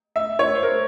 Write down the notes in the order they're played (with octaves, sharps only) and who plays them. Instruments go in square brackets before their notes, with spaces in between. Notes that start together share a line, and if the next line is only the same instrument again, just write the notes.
[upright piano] E5
C#5
C5
A#4